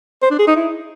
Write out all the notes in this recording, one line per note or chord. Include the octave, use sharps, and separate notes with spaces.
C5
D4
G#4
D#4
E4